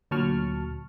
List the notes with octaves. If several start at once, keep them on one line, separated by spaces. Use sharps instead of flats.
D2 A#2 F#3 A5 C#6 F6